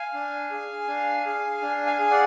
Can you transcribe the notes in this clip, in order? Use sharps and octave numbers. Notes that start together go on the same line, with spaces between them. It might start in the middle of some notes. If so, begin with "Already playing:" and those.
Already playing: F5 G#5
D4
G#4
D4
G#4
D4
F5 G#5
G#4
D5 F#5